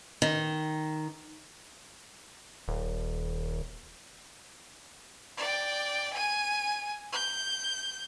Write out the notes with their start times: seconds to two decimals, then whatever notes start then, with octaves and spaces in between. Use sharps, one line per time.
0.22 D#3
2.68 D#1
5.38 D5 G5
6.13 G#5 D#7
7.12 G6